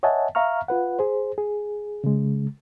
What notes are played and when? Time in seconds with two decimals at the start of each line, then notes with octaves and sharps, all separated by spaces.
0.03 C#5 D#5 E5 F#5 G#5 A5
0.35 E5 F5 A#5 C#6 F6
0.68 F4 B4 F#5
0.99 G#4 C5
1.38 G#4
2.04 C#3 G#3